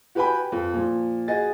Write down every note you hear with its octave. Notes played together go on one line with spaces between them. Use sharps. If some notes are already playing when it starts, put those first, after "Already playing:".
F#4 G4 B4 G5 G#5 B5
F2
A#2 F3
F#4 G#4 D#5 A6